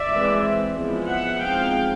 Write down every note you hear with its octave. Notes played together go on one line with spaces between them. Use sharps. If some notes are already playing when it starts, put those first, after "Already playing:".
Already playing: D5 E5
E3 G#3 C4
F3 G#3 B3 E4
E5 F#5
F3 G#3 C4 D#4 F5 G5